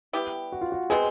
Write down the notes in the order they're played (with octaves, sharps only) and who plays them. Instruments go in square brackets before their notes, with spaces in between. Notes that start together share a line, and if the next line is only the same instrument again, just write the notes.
[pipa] G3 B3 E4 G4
[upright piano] F#4
F4
F#4
[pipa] B2 G#3 C4 [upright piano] G#4